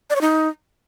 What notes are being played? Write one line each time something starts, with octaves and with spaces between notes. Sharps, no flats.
D5
C#5
D#4